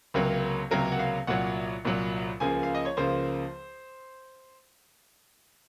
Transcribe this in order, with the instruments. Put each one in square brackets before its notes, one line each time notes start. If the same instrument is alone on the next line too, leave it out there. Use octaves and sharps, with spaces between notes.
[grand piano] C#2 C3 F#3 A#3
C#2 C3 F#3 A#3 A#4
F#5
F5
C2 A#2 F#3 F#5
C2 A#2 F#3
C#2 C#3 F3 A#3 G#5
F5
D#5
C#5
C#2 C#3 F3 A#3 C5